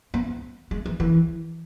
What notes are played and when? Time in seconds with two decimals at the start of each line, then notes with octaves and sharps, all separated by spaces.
0.14 B3
0.71 G#3
0.86 E3
1.00 E3